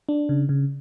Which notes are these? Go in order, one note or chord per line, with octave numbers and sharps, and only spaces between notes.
D4
C#3
C#3